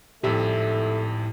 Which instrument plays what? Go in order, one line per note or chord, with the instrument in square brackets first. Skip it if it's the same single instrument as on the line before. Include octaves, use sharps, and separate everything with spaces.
[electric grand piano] G#1 F2 E5 [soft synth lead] A2 [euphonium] A3 [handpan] G4